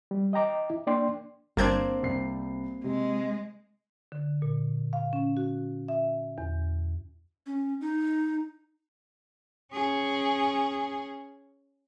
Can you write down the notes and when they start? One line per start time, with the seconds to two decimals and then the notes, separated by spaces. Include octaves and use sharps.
0.11 G3
0.33 D#5 G5 A#5 D6
0.70 E4
0.87 A#3 D4 D5 G5 C6
1.57 G1 A#3 C4 D4 G6 G#6
2.03 C2 C7
2.84 C3 G#3
4.12 D3
4.42 A#2
4.93 F5
5.13 C#4
5.37 F#4
5.88 E5
6.38 E2
7.47 C#4
7.81 D#4
9.73 C#4 G#4